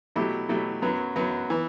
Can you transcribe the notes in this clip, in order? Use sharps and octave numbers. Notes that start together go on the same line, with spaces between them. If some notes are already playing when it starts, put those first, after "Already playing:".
B2 F#3 A3 E4 G4
B2 F#3 A3 E4 G4
F#2 F#3 B3
F#2 F#3 B3
E3 B3